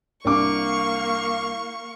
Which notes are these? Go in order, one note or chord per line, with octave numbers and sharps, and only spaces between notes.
C2 A#3 D4 F5 C#6 D6